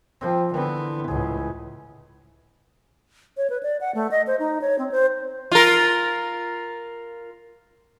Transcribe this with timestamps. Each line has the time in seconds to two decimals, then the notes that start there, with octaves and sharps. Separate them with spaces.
0.21 F3 C4
0.54 D3 E3 B3
1.08 C#2 A2 G#4
3.37 C#5
3.50 B4
3.63 D5
3.81 F#5
3.95 A3
4.11 D#5
4.27 C5
4.39 D#4
4.61 C#5
4.79 C4
4.92 C5
5.52 F4 A#4